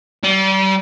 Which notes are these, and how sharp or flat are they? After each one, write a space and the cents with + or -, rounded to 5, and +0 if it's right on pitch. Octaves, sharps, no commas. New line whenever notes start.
G3 -35